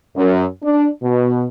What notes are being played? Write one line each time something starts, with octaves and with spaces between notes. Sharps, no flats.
F#2
D4
B2